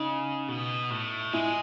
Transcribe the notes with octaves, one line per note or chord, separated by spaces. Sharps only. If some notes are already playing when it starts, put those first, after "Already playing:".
Already playing: C#3 D#4
B2
A2
G#3 E4